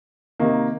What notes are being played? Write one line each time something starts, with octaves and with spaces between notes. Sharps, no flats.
C3 D#3 A#3